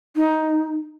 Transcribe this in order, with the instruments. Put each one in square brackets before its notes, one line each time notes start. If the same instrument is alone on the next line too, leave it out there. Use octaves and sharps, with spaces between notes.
[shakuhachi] D#4